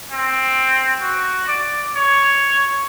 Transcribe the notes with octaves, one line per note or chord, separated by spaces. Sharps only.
C4
F#4
D5
C#5